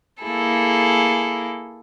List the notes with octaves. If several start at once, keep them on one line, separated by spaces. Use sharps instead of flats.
A#3 E4 G#4 A4